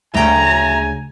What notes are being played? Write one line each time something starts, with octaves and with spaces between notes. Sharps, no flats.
D2 C#3 A3 G5 G#5 A#5